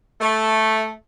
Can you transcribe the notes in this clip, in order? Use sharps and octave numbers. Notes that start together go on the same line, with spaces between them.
A3